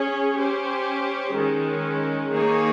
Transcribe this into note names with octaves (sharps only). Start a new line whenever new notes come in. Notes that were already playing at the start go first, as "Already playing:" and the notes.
Already playing: C#4 G#4 C#5
C#4 G4 C5
D#3 G#3 C#4
D#3 A#3 D#4 G#4 C#5